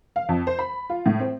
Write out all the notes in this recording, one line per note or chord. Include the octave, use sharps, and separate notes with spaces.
F5
F2
C5
B5
F4
A2
C4